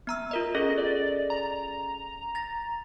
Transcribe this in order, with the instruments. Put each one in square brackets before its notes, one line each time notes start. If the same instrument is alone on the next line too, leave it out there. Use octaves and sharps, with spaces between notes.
[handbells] B3 A#5 E6
F4 A#4 D#5
[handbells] C#4 G#4 A4 [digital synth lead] D#5
[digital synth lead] D5
A#5
[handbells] A6 A#6